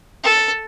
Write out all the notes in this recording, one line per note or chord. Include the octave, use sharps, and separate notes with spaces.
A4